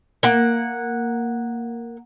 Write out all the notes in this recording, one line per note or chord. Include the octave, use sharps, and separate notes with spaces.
A#3 F#5